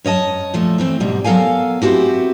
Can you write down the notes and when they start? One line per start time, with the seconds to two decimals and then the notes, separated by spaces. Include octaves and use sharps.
0.05 F#2 C#5 D#5 A5
0.54 A#2 F3 A3
0.78 E3 A3 C4
1.00 G#2 B2 G3
1.24 F#3 B3 A4 A#4 F5 G#5
1.82 B3 C4 E4 F#4 G4